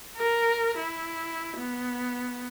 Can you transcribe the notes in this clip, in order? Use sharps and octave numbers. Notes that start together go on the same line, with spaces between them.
A#4
E4
B3